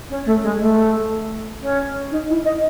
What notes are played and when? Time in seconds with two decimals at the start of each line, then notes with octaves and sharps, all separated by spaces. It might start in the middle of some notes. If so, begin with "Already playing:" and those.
0.09 C#4
0.25 A3
0.42 G#3
0.59 A3
1.61 C#4
2.11 D#4
2.28 E4
2.44 D#5